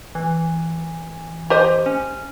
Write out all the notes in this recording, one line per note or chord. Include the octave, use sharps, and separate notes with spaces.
E3
G4 C5 D#5
C#4